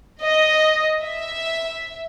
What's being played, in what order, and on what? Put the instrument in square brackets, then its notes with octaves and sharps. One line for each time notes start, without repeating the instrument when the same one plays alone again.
[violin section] D#5
E5